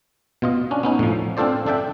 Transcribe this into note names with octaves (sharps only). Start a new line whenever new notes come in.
B2 F4 D#5
C#4 D4
B3 C#4 D#4
A2 F3
C4 D4 F4 A4 C5 D5
D4 A4 E5 G5